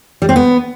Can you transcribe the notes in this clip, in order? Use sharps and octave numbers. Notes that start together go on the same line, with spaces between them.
G3
C4
B3